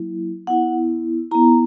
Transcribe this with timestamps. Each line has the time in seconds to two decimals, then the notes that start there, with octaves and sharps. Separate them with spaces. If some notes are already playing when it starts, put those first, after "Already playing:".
Already playing: F#3 A#3 E4
0.47 B3 E4 F#5
1.31 B3 E4 A#5